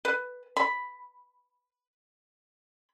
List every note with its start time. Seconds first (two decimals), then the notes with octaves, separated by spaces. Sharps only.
0.05 B4
0.57 B5